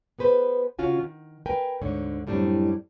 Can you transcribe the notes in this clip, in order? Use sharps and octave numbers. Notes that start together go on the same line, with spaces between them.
B3 G#4 B4 C5
C#3 C#4 F4 F#4 G#5
D#3
A#4 B4 G5 G#5
D2 G#2 D3 C#5
F#2 A2 G3 C4 D4